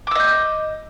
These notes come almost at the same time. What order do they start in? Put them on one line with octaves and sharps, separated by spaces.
D6 E6 D#5 G6